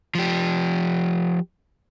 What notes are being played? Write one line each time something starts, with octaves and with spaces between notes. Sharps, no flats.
F3 G4